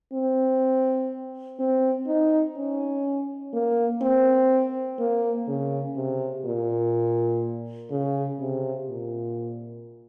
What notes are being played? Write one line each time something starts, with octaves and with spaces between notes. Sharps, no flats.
C4
C4
D#4
C#4
A#3
C4
A#3
C#3
C3
A#2
C#3
C3
A#2